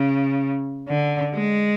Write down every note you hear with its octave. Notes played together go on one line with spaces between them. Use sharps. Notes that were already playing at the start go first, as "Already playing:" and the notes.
Already playing: C#3
D3
G#3